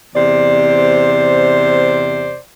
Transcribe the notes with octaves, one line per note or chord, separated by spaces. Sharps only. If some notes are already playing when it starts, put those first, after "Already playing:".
E2 C3 C5 D5